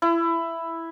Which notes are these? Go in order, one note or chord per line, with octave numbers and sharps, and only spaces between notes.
E4